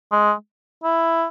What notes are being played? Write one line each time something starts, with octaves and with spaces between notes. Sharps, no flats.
G#3
E4